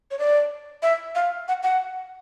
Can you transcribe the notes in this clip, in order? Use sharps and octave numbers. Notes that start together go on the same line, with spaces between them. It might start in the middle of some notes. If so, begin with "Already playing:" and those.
C#5
D5
E5
F5
F#5
F#5